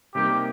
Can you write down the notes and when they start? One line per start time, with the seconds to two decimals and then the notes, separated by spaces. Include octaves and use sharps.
0.14 C3 G3 A#3 D#4 G4 A#4